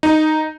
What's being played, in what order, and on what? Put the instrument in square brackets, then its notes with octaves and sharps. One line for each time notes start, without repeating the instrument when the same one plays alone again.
[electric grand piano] D#4